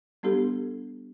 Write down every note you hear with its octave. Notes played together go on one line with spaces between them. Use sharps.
G3 B3 D4 G4 A4